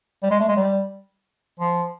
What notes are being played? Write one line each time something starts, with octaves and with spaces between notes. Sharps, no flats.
G3
G#3
A3
G#3
G3
F3